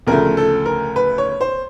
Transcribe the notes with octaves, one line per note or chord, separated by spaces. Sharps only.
D2 C#3 F3 A3 A#4
A4
A#4
B4
C#5
C5